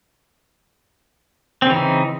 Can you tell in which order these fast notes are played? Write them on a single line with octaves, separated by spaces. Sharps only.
C4 C#3 E3 D#4